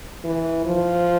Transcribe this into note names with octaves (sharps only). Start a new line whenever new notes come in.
E3
F3